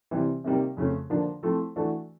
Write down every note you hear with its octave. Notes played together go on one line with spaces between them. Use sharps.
C3 E3 G3 C4
C3 D#3 G3 A#3
F2 C#3 F3 A3 C#4
D3 F3 A#3 D4
F3 A3 C4 E4 A4
E3 A3 D4 F#4 A4